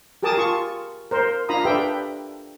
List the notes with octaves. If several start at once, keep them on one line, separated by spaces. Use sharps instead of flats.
G4 G#4 A#4 A5 D6 D#6
F4 C#6
A#4 C5
D4 F4 F5 A#5 B5 D#6
D4 G4 A4 B4 E5 G5